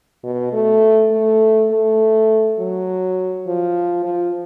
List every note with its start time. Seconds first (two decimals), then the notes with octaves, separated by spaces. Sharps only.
0.23 B2
0.53 A3
1.11 A3
1.71 A3
2.58 F#3
3.47 F3
4.04 F3